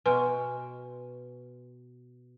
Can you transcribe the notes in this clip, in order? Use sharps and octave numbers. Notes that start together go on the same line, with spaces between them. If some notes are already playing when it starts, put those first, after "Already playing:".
B2 B4 G#5 C6 F6